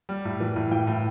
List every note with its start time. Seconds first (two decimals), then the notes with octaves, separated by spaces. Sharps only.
0.09 G3
0.25 A2
0.40 E3
0.56 A2
0.71 E3 G5
0.87 A2